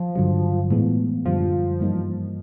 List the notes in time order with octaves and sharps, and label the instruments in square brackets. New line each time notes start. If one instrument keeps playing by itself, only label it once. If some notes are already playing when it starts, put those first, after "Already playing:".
Already playing: [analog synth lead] F3
[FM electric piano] G2 D3 F#3
A2 E3 G#3 B3
[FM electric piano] F#2 D3 G3 [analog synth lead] F3
[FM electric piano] G2 E3 G3 A#3 D#4